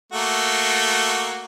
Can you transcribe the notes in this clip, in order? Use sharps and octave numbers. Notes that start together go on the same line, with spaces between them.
A3 A#3 F#4